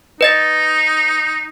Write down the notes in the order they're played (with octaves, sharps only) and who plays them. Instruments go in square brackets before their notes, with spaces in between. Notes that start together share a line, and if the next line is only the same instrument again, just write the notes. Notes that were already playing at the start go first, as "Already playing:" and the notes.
[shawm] D#4 [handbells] B4 D#5 A6